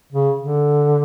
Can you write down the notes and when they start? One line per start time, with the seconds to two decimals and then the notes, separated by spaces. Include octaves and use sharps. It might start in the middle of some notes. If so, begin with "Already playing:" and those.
0.12 C#3
0.40 D3